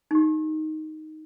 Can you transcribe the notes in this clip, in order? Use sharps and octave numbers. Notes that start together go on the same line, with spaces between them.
D#4 G4